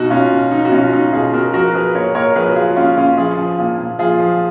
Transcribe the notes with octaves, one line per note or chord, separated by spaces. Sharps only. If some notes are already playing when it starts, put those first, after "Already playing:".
Already playing: B2 D#4 F#4
B2 C#4 F4
B2
B2 D#4
F#4
B2 C#4 F4
B2 D#4
B2 F4 G#4
B2 F#4 A#4
F3 F#4 A#4
F3 G#4 B4
A#2 A#4 C#5
A#2 A#4 C#5
F3 G#4 B4
F#4
F3 F4 G#4
A#2 C#4 F4
A#2 C#4 F4
F3 F4 G#4
F3
A#2
A#2
F3 F4 G#4
F3